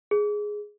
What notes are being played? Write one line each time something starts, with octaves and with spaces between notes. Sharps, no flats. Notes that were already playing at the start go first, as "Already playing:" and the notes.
G#4